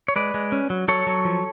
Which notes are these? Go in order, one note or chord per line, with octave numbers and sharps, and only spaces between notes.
C#5
G#3 B4 D5
G#3
C#4
F#3
F#3 A4 C#5
F#3
F3